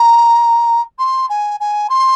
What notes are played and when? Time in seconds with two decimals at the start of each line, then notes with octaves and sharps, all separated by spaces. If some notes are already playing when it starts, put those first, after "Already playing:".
Already playing: A#5
0.98 C6
1.29 G#5
1.60 G#5
1.89 C6